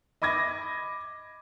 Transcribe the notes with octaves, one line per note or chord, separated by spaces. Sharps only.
D#5 B5 D6 G#6 A#6